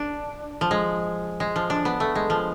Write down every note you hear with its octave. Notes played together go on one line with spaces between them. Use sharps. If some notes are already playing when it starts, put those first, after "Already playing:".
Already playing: D4
F3
G#3
G#3
F3
D4
B3
A3
G#3
F3